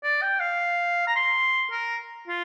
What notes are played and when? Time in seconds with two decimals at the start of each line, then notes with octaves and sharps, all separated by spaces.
0.04 D5
0.22 G5
0.40 F5
1.07 A#5
1.16 C6
1.71 A#4
2.28 F4